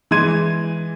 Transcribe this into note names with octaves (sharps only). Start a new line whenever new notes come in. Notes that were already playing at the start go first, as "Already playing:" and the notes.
E3 G#3 C6 G#6 D#7